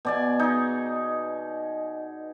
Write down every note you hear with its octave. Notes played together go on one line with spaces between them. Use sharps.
B2 D5 G#5
D#4 G#4